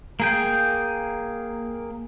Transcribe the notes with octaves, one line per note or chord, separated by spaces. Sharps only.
A#3 G#4 G5